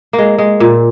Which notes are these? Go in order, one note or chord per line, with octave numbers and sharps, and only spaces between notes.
A#3
G#3
G#3
A#2